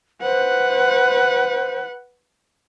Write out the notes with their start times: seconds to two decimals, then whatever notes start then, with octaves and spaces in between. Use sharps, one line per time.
0.22 B4 C5 F#5